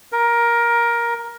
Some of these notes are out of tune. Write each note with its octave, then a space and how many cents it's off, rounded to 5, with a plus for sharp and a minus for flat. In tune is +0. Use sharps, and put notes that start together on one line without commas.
A#4 +15